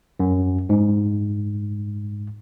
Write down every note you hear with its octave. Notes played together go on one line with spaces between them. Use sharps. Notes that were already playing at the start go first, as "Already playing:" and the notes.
F#2
G#2